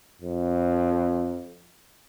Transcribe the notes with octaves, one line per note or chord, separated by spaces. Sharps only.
F2